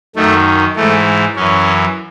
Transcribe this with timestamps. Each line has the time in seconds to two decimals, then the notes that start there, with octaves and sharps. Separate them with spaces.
0.16 F#2 D#3 A3
0.76 G#2 E3 A3
1.36 F#2 E3 C#4